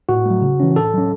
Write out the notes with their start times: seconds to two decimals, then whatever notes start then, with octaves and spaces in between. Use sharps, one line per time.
0.09 A2 F#4
0.26 F#3 A3
0.42 C#3
0.60 E3 C#4
0.76 A2 A4
0.94 F#3 C#4